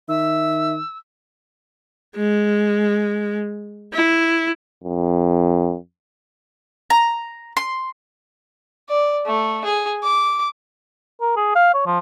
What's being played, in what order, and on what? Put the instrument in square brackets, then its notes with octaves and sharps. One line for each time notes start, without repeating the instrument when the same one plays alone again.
[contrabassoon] D#3 [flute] E5 [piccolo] E6
[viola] G#3
E4
[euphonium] F2
[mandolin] A#5
C6
[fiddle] D5
A3
G#4
D6
[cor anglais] A#4
G#4
F5
C#5
F3